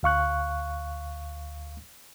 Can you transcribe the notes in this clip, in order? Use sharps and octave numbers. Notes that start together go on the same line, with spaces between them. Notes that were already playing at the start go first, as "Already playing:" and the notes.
D2 F5 C#6 F#6